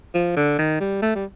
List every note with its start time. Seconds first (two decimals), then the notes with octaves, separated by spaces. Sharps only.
0.14 F3
0.37 D3
0.59 D#3
0.80 G3
1.02 A3
1.15 G3